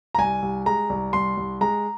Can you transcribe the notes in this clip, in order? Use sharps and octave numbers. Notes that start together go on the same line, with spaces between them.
A#5
C2 G#5
C2
G#3 A#5
C2
C2 C6
C2
G#3 A#5